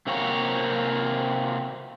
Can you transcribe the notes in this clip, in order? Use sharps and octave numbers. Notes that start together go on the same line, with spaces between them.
C3 A#3 C4 F#4 C#5 F5